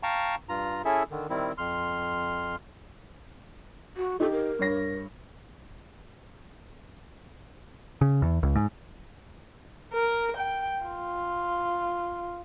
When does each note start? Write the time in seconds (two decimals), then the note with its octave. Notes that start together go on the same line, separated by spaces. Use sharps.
0.03 F5 G5 A5 A#5 C#6
0.49 G2 F4 A#5
0.85 C#4 E4 G#4 A4 E5
1.11 D3 D#3
1.30 D#3 G3 C4 E4
1.58 F2 C6 F6
3.97 F#4
4.20 D#4 G4 A4
4.32 A#4
4.59 G2 C#5 A#6
8.01 C#3
8.22 E2
8.43 C#2
8.56 G#2
9.93 A#4
10.37 G5
10.85 F4